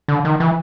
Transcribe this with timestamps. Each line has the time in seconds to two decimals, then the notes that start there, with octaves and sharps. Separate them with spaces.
0.08 D3
0.25 D#3
0.40 E3